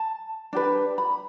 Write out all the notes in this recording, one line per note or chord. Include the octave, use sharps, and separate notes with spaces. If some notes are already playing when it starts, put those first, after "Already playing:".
Already playing: A5
D4 G4 B4
B5